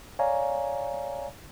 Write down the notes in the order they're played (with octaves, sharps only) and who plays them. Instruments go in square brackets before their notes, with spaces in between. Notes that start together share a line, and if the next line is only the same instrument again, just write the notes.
[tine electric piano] C#5 D5 F5 G#5 A#5